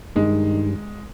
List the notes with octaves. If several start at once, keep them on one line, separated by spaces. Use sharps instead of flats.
G2 D#3 G#3